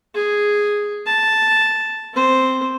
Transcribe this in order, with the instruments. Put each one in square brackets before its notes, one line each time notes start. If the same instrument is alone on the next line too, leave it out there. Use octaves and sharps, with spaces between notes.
[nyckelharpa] G#4
A5
C4 C5